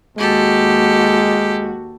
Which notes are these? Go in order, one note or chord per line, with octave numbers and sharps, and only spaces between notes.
D#2 G#3 F#4 G4 A4